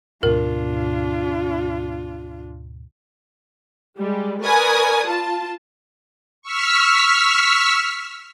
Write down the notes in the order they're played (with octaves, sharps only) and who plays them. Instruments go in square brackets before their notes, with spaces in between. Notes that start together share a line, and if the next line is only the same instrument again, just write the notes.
[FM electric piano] D2 G#2 B2 [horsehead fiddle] D4 F4 [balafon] A#4
[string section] G3 G#3
A#4 B4 D5 G#5 C#6 D#6
F4 A5
[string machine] C#6 E6 F6 B6